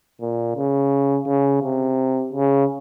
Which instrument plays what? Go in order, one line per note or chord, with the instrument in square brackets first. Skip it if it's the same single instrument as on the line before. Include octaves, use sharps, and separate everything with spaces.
[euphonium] A#2
C#3
C#3
C3
C#3